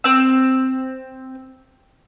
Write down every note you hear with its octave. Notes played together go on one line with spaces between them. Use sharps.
C4 E6